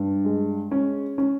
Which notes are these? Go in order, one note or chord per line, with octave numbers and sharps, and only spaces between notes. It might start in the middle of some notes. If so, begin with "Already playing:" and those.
Already playing: G2
G#3
C#4
C#4